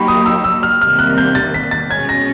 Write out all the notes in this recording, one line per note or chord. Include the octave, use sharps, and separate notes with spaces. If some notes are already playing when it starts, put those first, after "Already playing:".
Already playing: F#3 A#3 D#4 G4 B5 C#6
D#6
E6
E6
F6
C3 D#3 G3 A#3 F6
F#6
G6
A6
B6
A6
B2 G#3 C#4 G#6
A#6